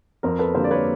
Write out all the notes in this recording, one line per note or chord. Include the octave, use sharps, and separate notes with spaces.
F2 A#4 C5
A4 B4
D3 G3 A#3 A#4 C5
D5
B4 C#5